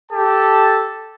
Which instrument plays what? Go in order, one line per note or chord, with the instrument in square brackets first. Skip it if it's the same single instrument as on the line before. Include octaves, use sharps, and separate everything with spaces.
[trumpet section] G4 A4 A5